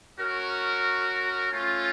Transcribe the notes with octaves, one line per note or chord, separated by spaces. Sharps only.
C#4 F#4 A#4
A3 C#4 F4